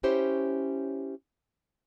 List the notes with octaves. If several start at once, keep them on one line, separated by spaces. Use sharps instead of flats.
C#4 E4 G4 C5 C#5